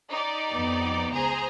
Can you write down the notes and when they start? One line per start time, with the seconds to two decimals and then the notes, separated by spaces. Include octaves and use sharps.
0.11 D#4 G4 D5
0.53 F2 B3
1.12 C#2 G#4 C5 A#5